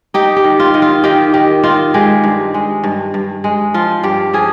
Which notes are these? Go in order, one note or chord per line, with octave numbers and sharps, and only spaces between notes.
D#4 G4
G4
D#3
F4
D#3
F4
D#3 G4
D#3 G4
D#3 F4
G#3 G4
G2
G#3
G2
G2
G#3
F3 F4
G2 G4
F3 G#4